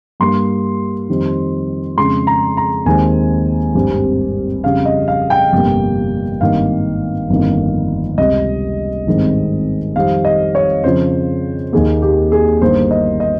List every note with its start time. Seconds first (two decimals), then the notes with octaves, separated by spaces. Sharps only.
0.20 G2 G3 A#3 C6
1.09 F2 D#3 G3 C4
1.97 F2 C#3 G#3 C6
2.27 A#5
2.57 A#5
2.86 D#2 D#3 G#3 C4 G#5
3.74 G#1 G2 G3 C4
4.63 F2 C#3 G3 F5
4.86 D#5
5.08 F5
5.30 G5
5.52 G1 F2 C3 G3 A#3
6.41 G#1 G2 D#3 A#3 F5
7.30 G1 F2 D#3 A#3
8.18 C#2 C3 G3 D#5
9.07 G#1 G2 D#3 G#3 C4
9.95 F2 D#3 G3 C4 F5
10.25 D#5
10.55 C#5
10.84 F2 C#3 F3 C4 C5
11.72 D#2 D#3 A#3 G#4
12.02 G4
12.32 G#4
12.61 G1 G2 D#3 A#3 C5
12.91 D#5
13.20 D#5